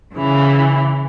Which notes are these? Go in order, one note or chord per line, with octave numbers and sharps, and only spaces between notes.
C#3 E3